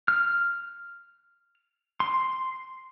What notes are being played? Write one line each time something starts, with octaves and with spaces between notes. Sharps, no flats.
F6
C6